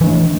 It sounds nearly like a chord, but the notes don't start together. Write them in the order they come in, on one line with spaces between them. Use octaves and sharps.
E3 D4 A3